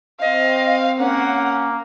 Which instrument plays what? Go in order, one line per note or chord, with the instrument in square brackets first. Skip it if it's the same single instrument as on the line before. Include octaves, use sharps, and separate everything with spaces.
[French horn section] C4 [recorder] D#5 [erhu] F5
[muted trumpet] A#3 [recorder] C#4 [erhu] F#5